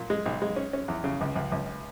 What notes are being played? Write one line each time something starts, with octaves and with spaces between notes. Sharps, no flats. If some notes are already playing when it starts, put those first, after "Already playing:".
Already playing: A#2
G#3
B1
G#3
C#4
C#4
E2
C#3
C#2
C#2
C#2